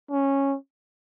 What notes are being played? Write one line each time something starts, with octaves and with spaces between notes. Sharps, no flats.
C#4